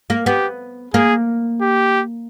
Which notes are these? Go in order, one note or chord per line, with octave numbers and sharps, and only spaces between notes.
A#3
B3 G4
A#3 G#4
G4